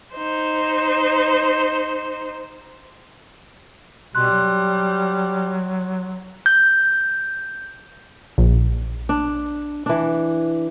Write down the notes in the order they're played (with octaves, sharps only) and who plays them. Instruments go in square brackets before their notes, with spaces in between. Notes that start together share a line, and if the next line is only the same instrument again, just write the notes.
[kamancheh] D#4 C5
[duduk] B2 [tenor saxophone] G3 [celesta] C6 F#6
[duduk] F#3
[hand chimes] G6
[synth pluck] A#1
[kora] D4
E3 D4